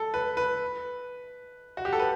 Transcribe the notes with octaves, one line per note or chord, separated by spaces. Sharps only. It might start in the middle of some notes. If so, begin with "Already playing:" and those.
Already playing: A4
B4
B4
F#4
G4
A4
B4